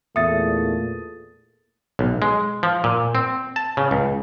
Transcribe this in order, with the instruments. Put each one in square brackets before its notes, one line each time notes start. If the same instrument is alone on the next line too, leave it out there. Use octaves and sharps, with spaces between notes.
[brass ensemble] E2 A3 [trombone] A#2 [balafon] E5 [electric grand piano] D#6 A6
[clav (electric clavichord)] B1
G#3
F3
A#2
C4
A5
C#3
C#2